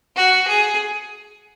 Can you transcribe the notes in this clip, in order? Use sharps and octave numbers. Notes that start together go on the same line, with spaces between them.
F#4
G#4